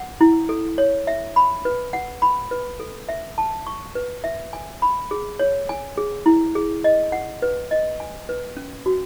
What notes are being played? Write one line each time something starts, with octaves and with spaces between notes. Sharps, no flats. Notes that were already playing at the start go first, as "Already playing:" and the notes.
Already playing: F#5
E4
A4
C#5
E5
B5
B4
F#5
B5
B4
A4
E5
A5
C#6
B4
E5
G#5
B5
G#4
C#5
G#5
G#4
E4
G#4
D#5
F#5
B4
D#5
G#5
B4
C#4
F#4